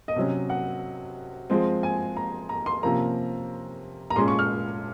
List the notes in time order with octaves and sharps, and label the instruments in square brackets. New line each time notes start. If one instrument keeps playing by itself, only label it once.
[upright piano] D#5
C3 F#3 C#4
F#5
F3 G#3 C4
G#5
A#5
A#5
C6
C3 F3 A#3 C#4 A#5
A#5
A#2 G#3 C#4 C6
C#6
F6